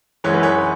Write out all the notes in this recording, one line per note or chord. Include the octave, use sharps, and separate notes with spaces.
F#2 E3 G#3 C#5
B4
C#5